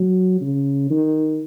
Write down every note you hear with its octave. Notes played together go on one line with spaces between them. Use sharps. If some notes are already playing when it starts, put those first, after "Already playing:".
Already playing: F#3
C#3
D#3